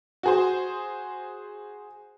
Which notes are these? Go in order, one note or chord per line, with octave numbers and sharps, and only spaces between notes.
F#4 G#4 C5